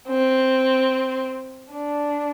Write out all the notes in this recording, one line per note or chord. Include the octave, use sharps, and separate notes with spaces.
C4
D4